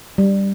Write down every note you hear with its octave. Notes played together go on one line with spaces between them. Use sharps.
G3